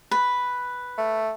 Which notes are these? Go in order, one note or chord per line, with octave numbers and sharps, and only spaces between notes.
B4
A3